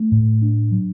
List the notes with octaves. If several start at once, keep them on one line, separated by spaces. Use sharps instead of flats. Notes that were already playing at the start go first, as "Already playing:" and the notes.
Already playing: A3
A2
D4
F#3